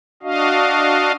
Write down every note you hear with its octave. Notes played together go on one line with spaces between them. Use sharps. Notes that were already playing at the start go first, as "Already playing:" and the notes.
D4 F#4 D#5 F5